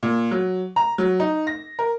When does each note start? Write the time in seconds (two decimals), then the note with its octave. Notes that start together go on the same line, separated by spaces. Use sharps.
0.03 A#2
0.31 F#3
0.76 A#5
0.98 F#3
1.20 D#4
1.47 A#6
1.79 A#4